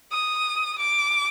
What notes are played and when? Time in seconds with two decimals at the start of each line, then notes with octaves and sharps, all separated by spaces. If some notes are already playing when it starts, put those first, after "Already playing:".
0.12 D#6
0.79 D6